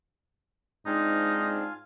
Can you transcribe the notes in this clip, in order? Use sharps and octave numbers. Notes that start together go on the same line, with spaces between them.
G#2 C4 D4 D#4 F4 F5 G#5